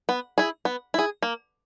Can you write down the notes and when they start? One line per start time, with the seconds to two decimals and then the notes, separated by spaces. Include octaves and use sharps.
0.09 B3
0.38 E4 G#4
0.65 B3
0.94 E4 G#4
1.23 A#3